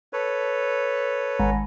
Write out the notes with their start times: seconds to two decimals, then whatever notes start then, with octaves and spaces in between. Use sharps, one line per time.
0.13 A4 B4 C#5
1.40 G#1